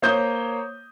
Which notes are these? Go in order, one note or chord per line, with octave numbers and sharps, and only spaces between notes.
A#3 C5 C#5 D#6 G6